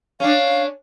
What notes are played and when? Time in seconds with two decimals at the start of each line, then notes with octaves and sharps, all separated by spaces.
0.20 C#4 D4 F5